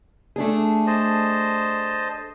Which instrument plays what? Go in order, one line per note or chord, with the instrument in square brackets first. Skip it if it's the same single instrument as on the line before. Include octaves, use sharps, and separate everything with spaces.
[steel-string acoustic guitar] A3 D4 G#4
[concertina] C5 D#5 A5